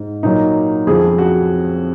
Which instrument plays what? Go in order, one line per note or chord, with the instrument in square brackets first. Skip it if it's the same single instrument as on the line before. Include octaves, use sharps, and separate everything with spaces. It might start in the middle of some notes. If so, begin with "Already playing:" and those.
Already playing: [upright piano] G#2
A#2 F#3 D#4
F2 C#3 F3 G#4
F#4